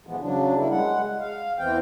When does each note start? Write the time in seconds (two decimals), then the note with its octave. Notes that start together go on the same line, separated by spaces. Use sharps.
0.07 F2 A#2 E3 F3 G#3 B3
0.20 C#3 F#3 D4
0.56 G3 A#3 E4
0.71 G#3 F#5
1.20 F5
1.59 E2 E3 C4 G5